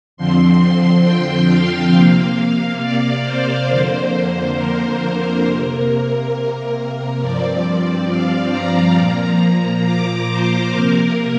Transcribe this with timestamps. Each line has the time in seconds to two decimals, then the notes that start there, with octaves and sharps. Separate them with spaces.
0.17 F2 D3 F3 C4 C6
0.61 C6
1.04 G5
1.48 F5
1.93 C3 A#3
2.81 D5
3.24 C5
3.68 F2 D3 A#3
4.56 A#4
5.44 C3 A#3 A#4
6.33 A#4
7.20 G2 F3 C4 D5
7.65 D5
8.08 F5
8.52 A#5
8.96 A#2 F3 A#3 A#5
9.84 D6
10.29 C5
10.72 C3 A#3 A#4